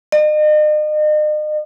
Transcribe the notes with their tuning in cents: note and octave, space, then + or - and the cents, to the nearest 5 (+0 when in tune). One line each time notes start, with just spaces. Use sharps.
D#5 -40